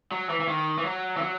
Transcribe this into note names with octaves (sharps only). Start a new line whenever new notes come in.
F#3
E3
E3
D#3
E3
F#3
E3
F#3